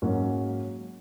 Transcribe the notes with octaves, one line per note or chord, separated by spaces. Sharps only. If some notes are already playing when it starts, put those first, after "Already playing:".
G#2 F#3 A#3 C#4